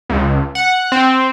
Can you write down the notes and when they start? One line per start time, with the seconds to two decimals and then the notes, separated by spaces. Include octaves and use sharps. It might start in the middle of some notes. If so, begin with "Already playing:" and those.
0.10 C#2
0.55 F#5
0.92 C4